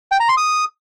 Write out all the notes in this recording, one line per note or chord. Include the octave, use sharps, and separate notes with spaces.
G5
A#5
C6
D#6